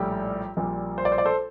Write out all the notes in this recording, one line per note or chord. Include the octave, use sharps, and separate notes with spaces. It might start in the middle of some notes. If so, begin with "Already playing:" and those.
Already playing: A#1 A2 G3 G4
A#1 A#2 G3
C5
D5
C5
D5
A4 C5